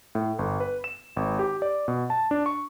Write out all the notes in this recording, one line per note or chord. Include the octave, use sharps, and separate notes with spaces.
A2
G1
B4
E7
G#1
G4
D5
B2
A5
D4
C#6